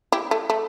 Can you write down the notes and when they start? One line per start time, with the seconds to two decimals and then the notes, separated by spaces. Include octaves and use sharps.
0.12 E4 G4
0.31 A3
0.50 A3